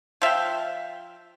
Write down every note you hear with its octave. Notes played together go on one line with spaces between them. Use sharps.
F3 E5 F5 G5